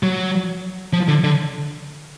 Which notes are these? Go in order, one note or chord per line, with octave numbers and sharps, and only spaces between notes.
F#3
F3
D3
D3